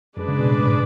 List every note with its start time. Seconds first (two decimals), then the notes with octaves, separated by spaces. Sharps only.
0.17 F#2 G#3 D4 G#4 B4 D5
0.28 C#3
0.39 B2
0.49 A2
0.60 G#2